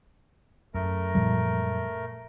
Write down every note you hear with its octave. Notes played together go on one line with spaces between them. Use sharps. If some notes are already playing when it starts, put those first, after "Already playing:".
F#2 A3 A#4
A#2 F3 G3